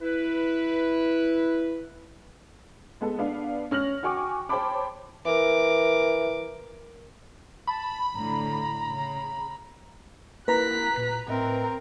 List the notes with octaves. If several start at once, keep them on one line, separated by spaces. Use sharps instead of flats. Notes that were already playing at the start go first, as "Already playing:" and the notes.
E4 B4
G#3 B3 A4
B3 D4 F5
C#4 F6 A#6 F#7
F#4 G5 G#5 C#6 D6
C5 C#5 G5 A5 B5 D6
E3 A#4 D6
A5 B5
A2 D3 A#5
C#3
A#3 E4 A#4 B4 A#5 F#6 B6
A#2
A2 C4 A#4 D#5 E5